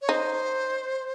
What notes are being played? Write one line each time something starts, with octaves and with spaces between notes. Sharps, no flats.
C#5
D#4 C5